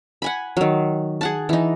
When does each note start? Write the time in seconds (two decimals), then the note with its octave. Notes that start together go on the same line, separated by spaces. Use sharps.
0.22 F#5 G#5 B5
0.57 D#3 F#3
1.21 G#4 F#5 A5
1.49 E3 D#4